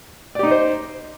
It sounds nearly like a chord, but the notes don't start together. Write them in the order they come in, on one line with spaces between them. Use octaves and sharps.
D5 G4 D#4 D#5 C5